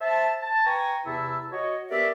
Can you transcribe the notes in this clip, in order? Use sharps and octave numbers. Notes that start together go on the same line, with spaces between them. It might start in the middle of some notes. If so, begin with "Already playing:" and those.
C5 E5 A5
A5
B4 G5 G#5 A#5 C#6
E2 C3 E4 E5 A5 E6
F#4 C#5 D#5
B3 G4 A#4 D5 E5